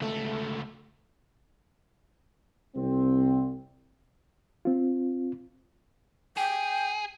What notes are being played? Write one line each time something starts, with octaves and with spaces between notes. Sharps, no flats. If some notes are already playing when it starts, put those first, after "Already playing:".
C#2 A3
C2 C4
C4 F4
G#4 G5